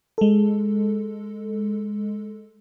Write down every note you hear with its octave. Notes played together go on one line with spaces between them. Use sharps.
G#3 A4